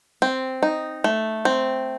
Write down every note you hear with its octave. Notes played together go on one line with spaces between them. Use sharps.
C4
D#4
A3
C4